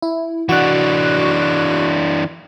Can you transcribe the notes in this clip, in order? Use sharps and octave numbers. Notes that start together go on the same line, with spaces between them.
E4
E3 D4 F#4 C#6 F#6